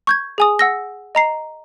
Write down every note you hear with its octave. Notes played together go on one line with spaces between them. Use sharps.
C#6 G6 G#6
G#4 G#5 D#6
F#5 E6 A#6
D#5 A#5 C7